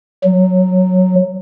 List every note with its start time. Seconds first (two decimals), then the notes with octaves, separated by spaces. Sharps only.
0.24 F#3